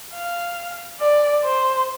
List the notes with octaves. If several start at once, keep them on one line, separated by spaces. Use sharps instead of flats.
F5
D5
C5